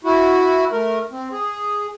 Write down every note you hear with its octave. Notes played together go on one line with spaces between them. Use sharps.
E4 F#4
A3 A#4
C4
G#4